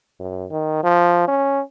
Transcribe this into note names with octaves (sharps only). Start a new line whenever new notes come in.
F#2
D#3
F3
C#4